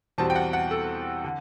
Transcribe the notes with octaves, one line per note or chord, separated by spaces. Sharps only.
E2 B2 G3 C4 A5
G5
F#5
F#5
A4
D3